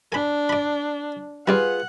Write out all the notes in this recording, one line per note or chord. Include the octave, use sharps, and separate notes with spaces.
D4 G#5 B5
D5 B5
G3 F4 G#4 B4 D5 F#5